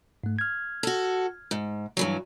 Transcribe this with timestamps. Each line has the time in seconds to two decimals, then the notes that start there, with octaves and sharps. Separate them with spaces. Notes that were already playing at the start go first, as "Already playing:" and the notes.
0.24 G#2 A3
0.39 F6 G#6
0.83 F#4 A4
1.51 G#2
1.97 G2 E3 F#3 F#4